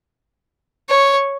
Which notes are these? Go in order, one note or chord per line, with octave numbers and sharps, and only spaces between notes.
C#5